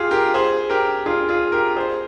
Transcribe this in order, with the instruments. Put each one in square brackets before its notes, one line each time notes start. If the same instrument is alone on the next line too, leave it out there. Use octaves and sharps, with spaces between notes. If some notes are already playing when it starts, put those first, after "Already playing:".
Already playing: [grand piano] F4 G4 G#4
G4 A#4
G#4 C5
G4 A#4
F4 G#4
F4 G#4
G4 A#4
G#4 C5